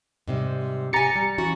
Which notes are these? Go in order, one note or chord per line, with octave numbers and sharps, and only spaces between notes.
G#2 C3 G3
G4 G#5 A#5 A6 C#7
G3
E3 C#4 F#4